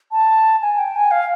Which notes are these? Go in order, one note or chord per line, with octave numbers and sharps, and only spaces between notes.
A5
G#5
G5
G#5
F5